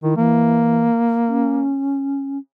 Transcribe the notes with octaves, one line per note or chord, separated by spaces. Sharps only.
D#3 E4
E3 A#3
C#4